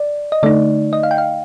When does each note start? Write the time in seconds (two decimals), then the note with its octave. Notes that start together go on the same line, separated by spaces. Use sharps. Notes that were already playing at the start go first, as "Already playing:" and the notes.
Already playing: D5
0.32 D#5
0.43 D3 A3 D#4 D5
0.93 D#5
1.03 F5
1.11 G5
1.18 F5